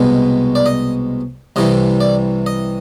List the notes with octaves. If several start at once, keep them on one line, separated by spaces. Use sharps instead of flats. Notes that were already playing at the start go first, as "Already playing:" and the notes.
Already playing: C2 B2 G#3 B3
D5
D#5
C2 C3 E3 G3 D#5
D5
D#5